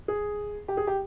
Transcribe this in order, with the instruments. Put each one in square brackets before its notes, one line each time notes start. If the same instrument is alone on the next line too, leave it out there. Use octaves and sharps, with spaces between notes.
[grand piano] G#4
G4
G#4
G4